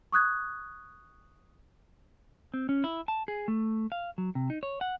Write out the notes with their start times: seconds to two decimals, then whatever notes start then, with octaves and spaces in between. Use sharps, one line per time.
0.12 C#6 D#6 F#6 G#6
2.54 C4
2.69 C#4
2.84 E4
3.08 A5
3.28 G#4
3.48 A3
3.92 F5
4.18 F#3
4.35 C3
4.50 D#4
4.63 C#5
4.81 F#5